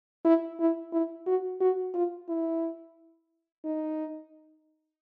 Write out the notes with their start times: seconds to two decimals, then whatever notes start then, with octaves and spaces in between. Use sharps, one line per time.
0.25 E4
0.60 E4
0.93 E4
1.26 F#4
1.61 F#4
1.95 F4
2.29 E4
3.65 D#4